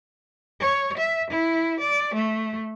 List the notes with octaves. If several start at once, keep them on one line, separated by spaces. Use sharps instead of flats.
C#5
E5
E4
D5
A3